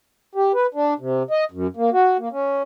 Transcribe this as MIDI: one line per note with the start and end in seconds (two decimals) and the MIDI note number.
0.35 0.52 67
0.54 0.66 71
0.74 0.94 62
0.99 1.23 48
1.31 1.44 75
1.51 1.67 42
1.77 1.90 58
1.93 2.17 66
2.19 2.29 58
2.32 2.62 61